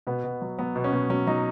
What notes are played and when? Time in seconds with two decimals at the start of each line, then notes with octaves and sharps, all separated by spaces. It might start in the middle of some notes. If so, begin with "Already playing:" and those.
0.07 B2 B3
0.24 B2
0.41 F#3
0.59 F#3 B3
0.76 B2
0.84 C#4
0.93 B2
1.10 F#3 C#4
1.27 F#3 D#4